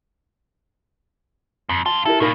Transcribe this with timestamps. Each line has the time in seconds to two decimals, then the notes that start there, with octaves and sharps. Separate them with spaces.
1.69 F2
1.86 F2 F4 A5
2.06 E4 G4 A4 A#4
2.20 A2 A#3 D#4 A#4 B5